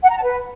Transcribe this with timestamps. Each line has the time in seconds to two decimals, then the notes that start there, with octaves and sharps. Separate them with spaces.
0.03 F#5
0.10 A#5
0.16 A5
0.23 B4